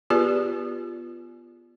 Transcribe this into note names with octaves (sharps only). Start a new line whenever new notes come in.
B3 F4 G4 G#4 B4 D5